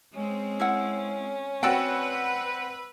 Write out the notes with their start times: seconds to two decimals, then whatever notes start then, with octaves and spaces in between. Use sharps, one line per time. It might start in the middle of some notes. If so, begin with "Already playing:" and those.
0.14 G#3 C4 C#4
0.60 E4 A#4 F#5
1.63 C4 F#4 B4 D5 F#5 G5 E6